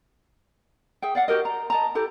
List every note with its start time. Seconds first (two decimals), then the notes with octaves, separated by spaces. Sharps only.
1.02 G#4 E5 G5
1.15 D5 F5 F#5
1.28 F#4 G4 A#4 D#5
1.45 A#5
1.70 D#5 A5 A#5
1.95 E4 G4 A4 A#5